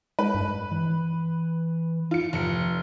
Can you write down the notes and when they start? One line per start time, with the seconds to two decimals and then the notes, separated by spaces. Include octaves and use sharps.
0.19 G#3 B4
0.34 G2
0.71 E3
2.11 F4 C#7
2.33 F1 C#7